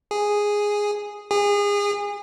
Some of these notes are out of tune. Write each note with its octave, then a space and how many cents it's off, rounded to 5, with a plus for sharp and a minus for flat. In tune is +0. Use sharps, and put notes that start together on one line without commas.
G#4 -5
G#4 -30